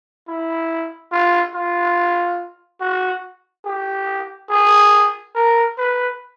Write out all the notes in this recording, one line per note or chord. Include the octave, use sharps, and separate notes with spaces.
E4
F4
F4
F#4
G4
G#4
A#4
B4